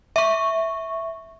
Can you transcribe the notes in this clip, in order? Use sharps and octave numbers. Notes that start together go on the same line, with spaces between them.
E5 C#6